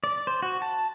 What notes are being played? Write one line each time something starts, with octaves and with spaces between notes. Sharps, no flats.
D5
C5
F#4
A5